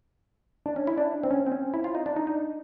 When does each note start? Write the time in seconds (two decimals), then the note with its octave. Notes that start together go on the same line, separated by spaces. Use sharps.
0.66 D4
0.76 C#4
0.87 E4
0.98 D4
1.24 C4
1.31 C#4
1.47 C4
1.52 C#4
1.74 E4
1.84 F4
1.95 D#4
2.06 D4
2.16 D#4
2.27 D#4